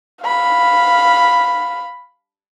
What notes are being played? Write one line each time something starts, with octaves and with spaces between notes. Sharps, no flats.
F5 B5